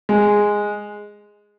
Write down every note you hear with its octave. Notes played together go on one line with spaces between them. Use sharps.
G#3